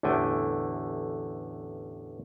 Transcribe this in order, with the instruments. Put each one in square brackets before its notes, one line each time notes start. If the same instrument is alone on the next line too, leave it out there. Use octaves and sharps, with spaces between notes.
[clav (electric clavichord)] A1 E2 D3 A3 G5 G#5